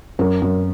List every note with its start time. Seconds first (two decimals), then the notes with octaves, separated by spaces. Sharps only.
0.19 F#2 A#4
0.42 F#2